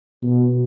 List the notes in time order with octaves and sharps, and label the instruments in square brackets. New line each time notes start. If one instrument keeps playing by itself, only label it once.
[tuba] B2